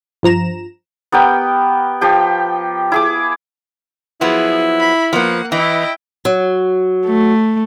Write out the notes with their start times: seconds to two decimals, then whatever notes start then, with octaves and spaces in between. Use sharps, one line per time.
0.23 G2 F3 A#5 E7
1.12 B3 G4 A#4 G5
2.01 F3 G4 G5
2.92 E4 G#4 D6
4.21 F3 F#3 B3 E4 G#4
4.80 B5
5.13 F3 A#3 B3 F#5
5.52 E3 E4 D#5 G5
6.25 F#3
7.06 A3